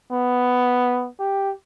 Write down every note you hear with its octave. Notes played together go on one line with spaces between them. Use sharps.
B3
G4